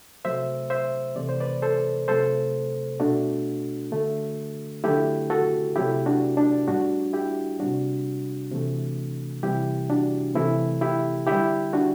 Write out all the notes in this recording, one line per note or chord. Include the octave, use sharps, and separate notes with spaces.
C3 F#3 A3 C5 E5
C5 E5
C3 E3 A3 D5
C5
B4 D5
A4 C5
C3 F#3 A3 A4 C5
B2 A3 D4 F#4
D3 A3
D3 F#3 A3 E4 G4
F#4 A4
C3 F#3 A3 E4 G4
D4 F#4
D4
A2 G3 D4 F#4
E4 G4
C3 G3 D4 F#4
C3 E3 A3
C3 E3 G3 E4 G4
D4 F#4
C3 E3 A3 E4
E4 G4
D3 G3 E4 G4
D4 F#4